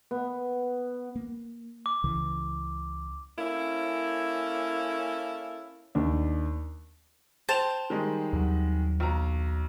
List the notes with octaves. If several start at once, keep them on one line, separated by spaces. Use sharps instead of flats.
B3
A#3
D6
C#2 C#3 E3
A#3 C#4 E4 A4
D#2 D4
C5 G5 A5 F7
D#3 G3 G#3
D#2 F#3
B1 A#5